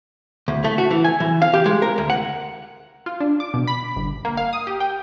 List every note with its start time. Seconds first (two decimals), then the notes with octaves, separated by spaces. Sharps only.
0.48 D2
0.64 A3
0.78 F#4
0.91 E3
1.04 G#5
1.20 E3
1.42 F5
1.54 G4
1.66 G#3
1.82 A#4
1.98 D2
2.10 F#5
3.06 F4
3.20 D4
3.40 D6
3.54 B2
3.67 B5
3.96 G1
4.25 A#3
4.37 F5
4.53 D#6
4.67 G4
4.80 G5